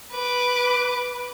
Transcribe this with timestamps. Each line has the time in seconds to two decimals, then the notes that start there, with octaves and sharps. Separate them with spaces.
0.12 B4 D6